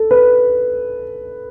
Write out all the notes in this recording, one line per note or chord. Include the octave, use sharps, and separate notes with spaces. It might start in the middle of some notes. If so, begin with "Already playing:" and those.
Already playing: A4
B4